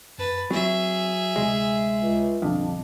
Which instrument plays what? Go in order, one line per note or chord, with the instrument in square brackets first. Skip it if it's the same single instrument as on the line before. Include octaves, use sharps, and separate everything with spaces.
[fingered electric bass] F#2 [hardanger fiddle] B4 A5
[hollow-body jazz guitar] F#3 [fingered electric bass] C4 [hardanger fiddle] G#4 E5
[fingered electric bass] D2 C3 [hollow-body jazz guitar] G#3
[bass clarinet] C#2
[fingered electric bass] B1 D3 G3 [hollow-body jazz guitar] F2 [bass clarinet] D4